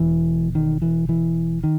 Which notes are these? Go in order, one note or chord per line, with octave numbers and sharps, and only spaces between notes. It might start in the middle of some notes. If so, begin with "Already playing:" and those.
Already playing: E1 E2 B2 E3
D#3
E3
E3
D#3